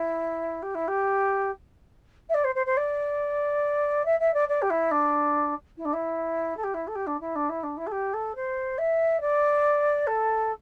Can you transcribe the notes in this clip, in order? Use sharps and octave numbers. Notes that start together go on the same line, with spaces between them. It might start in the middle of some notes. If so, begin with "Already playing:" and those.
Already playing: E4
G4
E4
G4
E5
D5
C5
C5
C5
D5
E5
E5
D5
D5
G4
E4
D4
E4
D4
E4
A4
G4
E4
A4
G4
D4
E4
D4
E4
D4
E4
A4
G4
A4
C5
E5
D5
A4